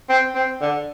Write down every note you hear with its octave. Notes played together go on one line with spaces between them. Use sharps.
C4
C4
D3